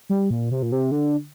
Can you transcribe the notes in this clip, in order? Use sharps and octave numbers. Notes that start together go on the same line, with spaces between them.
G3
A#2
C3
A#2
C3
D3